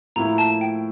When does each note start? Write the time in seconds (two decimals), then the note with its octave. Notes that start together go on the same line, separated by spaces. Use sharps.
0.16 A2 F3 A#3 E4 A#5
0.38 A5
0.61 G5